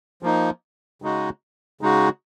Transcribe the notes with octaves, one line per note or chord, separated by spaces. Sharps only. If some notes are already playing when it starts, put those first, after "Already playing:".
F3 A#3 D#4
C#3 G#3 D#4 F#4
C#3 G#3 D#4 F#4